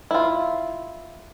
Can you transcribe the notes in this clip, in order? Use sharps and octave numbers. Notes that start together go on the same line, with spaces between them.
E4 F4